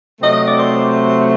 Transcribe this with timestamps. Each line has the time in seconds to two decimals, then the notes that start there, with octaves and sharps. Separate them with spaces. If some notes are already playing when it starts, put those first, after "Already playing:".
0.20 C3 F#3 A3 C4 D#5
0.33 D#5
0.46 D5
0.58 C5